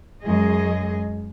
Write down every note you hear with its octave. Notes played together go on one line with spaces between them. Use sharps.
F#2 G#3 G#4 D#5